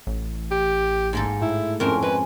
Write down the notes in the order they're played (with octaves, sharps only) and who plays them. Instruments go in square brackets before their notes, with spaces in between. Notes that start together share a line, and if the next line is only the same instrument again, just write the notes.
[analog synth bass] A1
[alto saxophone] G4
[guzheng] G#2 A#3 A4
[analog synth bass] A2 [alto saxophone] E4
[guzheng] F2 C4 C#4 [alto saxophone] A#4
[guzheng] G#3 [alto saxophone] B4